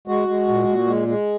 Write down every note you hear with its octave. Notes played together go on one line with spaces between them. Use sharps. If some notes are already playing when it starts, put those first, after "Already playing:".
G#3 F#4
G#3
A#2
A#2
G#3
G#3